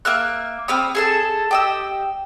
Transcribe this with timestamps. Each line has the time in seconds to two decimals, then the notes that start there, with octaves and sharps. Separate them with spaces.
0.05 A#3 E5 F6 F#6
0.68 C4 F5 B5 D#6
0.95 G#4 A4 A5
1.51 G4 D#5 E6